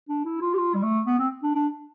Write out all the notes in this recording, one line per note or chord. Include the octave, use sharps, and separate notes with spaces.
D4
E4
F4
G4
F4
G3
A3
B3
C4
D4
D4